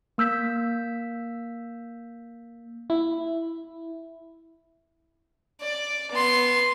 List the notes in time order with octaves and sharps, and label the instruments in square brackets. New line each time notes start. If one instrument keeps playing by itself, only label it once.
[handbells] A#3 E6 G6 B6
[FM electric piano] E4
[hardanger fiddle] D5
B3 C6